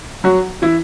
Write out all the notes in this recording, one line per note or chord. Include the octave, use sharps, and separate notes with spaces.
F#3 F#4
E3 E4